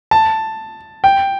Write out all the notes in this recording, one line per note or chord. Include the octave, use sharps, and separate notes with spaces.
A5
G5